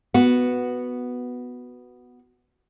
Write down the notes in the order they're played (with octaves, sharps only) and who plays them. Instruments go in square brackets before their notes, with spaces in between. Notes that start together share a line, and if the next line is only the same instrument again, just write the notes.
[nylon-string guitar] B3 F#4